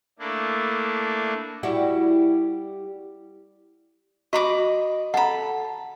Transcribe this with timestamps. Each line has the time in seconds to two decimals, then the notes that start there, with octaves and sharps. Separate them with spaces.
0.19 A3 A#3 D4 E4
1.63 G3 E4 F#4
4.33 F#4 D#5 B5 C#6 D6
5.14 A4 F#5 A#5 B5